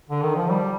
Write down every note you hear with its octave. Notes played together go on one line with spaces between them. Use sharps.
D3
D#3
F3
G3